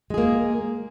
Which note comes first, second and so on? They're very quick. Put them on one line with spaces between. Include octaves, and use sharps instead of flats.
G#3 G#4 A#3